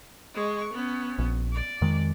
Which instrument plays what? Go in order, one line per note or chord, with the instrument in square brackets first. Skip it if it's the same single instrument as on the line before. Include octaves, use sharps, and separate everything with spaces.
[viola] G#3 C#6
B3 C#4
[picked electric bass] A#1
[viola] D5
[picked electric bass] F2 D#3 G#3